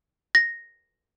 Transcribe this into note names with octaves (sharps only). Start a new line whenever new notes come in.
A#6